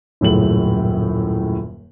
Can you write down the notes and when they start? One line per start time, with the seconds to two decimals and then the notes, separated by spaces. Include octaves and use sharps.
0.21 D#1 F#2 A2 C#3 F#7